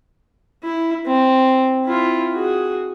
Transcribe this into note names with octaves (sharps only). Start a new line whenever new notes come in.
E4
C4
E4 F4
F#4 G#4